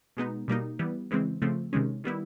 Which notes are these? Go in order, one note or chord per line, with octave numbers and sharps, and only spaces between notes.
B2 G#3 B3 D#4
B2 G3 A#3 D#4
E3 G3 B3
C#3 E3 G#3 C4
C#3 F3 A3 C4
C3 D#3 G#3 C#4
D#3 G3 B3 E4